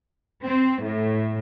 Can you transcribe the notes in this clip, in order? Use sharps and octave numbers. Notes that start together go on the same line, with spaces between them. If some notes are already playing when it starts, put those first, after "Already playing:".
C4
A2